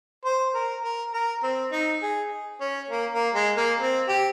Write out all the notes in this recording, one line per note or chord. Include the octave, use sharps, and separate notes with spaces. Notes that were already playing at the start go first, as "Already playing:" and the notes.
C5
A#4
A#4
A#4
C4
D#4
G#4
C#4
A#3
A#3
G#3
A#3
C4
G4